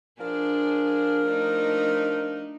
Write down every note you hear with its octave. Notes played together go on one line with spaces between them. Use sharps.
F3 D4 G#4 A#4
A3 D4 D#4